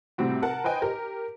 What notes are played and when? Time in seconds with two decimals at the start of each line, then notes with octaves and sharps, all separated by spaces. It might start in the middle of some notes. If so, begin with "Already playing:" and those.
0.18 A2 C3 G3 C4 F#4
0.42 A#4 F#5 A5
0.64 B4 C5 D#5 G5 G#5
0.82 G4 A#4